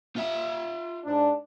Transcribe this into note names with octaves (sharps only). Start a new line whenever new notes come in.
F4 E5
G#2 D4